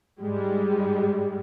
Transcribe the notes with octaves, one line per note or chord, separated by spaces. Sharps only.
G#2 G3 G#3